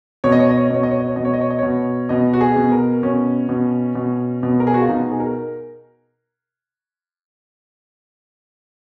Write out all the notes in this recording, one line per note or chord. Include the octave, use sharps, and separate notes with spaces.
B2 C#5
D#5
C#5
D#5
C#5
D#5
B2 C#5
D#5
C#5
D#5
C#5
B2 D#5
C#5
D#5
C#5
D#5
B2 C#5
B2 D#5
F#4
G#4
B2
A#4
B2 C#4
B2
B2
B2
A#4
G#4
F#4
F4
B2 D#4
G#4
A#4